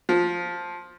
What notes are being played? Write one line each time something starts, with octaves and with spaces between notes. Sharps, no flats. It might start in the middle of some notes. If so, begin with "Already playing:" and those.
F3